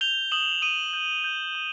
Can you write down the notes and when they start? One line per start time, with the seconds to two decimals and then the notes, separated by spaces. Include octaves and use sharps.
0.01 G6 F7 G7
0.31 D#6 E7 F#7
0.62 D#6 D#7 F7
0.93 G6
1.24 G6
1.55 D#6